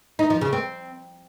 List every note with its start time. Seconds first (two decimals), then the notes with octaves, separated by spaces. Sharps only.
0.19 D#4
0.30 F3
0.41 C#3
0.53 C4